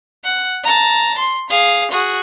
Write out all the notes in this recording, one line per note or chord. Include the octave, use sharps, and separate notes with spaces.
F#5
A5 A#5
C6
G#4 F5
F#4 G#4